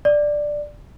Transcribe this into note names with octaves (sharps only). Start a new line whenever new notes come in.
D5